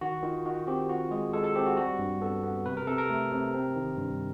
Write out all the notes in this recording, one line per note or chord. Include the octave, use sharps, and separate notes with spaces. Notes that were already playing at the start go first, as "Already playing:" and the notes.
D#3 F#4
D#3 F4
D#3 F#4
C4 G4
F4 F#4
G#3 G#4
G#3 A4
A4
C4 G4
F#4
G3 F#4
G2
B3 A4
B3
C3 B4
A#4
C3 A4
A#4
A3
C3
C4
D#3
G2